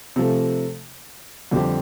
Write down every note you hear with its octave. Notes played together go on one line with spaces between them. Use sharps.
C3 F3 A3
F2 D3 G3 C4 G4